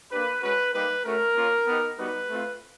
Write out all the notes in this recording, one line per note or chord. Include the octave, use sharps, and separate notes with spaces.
A#3 D4 G4 B4
G#3 C#4 F#4 B4
G3 A#3 D#4 G4 B4
A3 C#4 F#4 A#4
A#3 C#4 F4
B3 D#4 G4
G3 B3 D#4 F#4 B4
A3 C4 F4